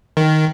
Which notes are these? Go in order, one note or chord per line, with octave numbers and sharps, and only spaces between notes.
D#3